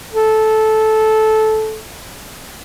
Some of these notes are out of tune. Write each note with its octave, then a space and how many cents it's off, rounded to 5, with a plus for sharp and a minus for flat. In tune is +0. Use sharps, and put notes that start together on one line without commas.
A4 -15